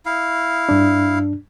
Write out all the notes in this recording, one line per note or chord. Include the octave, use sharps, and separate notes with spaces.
E4 F5
G2 D4